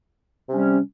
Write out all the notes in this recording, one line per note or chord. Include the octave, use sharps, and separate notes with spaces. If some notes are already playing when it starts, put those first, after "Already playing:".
C3 G3 C#4